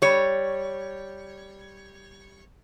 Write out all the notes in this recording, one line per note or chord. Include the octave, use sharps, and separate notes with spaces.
G3 C#5